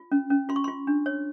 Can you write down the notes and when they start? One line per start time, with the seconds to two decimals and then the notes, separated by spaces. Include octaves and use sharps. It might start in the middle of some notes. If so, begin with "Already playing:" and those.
Already playing: F4
0.11 C#4
0.30 C#4
0.49 F4 C6
0.56 C#6
0.64 F4 C6
0.87 D4
1.06 C#5